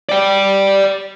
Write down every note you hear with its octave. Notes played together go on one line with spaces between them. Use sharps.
D5 G5